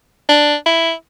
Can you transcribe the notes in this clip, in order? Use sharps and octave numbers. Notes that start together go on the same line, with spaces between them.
D4
E4